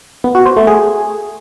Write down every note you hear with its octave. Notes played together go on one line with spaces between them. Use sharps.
B3
F#4
C5
A3
G#4